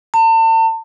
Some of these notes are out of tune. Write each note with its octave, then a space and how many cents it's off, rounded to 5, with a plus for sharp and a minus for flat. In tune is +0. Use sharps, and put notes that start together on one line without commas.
A5 +40